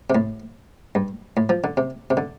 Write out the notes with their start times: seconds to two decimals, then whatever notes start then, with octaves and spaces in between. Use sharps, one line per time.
0.10 C3
0.15 A2
0.95 G2
1.37 A2
1.49 F3
1.64 D3
1.77 C3
2.10 C3
2.17 D3